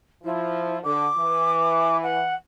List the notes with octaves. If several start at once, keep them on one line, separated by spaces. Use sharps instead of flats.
F3 E4
D3 D6
E3
F#5